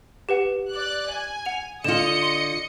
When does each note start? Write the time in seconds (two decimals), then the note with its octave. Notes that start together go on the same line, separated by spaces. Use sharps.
0.29 G4 B4 F#5
0.71 D5 F#6
1.10 G#5
1.46 F#5 F7
1.84 D3 F4 D#5 D#6 C#7 E7
2.22 C6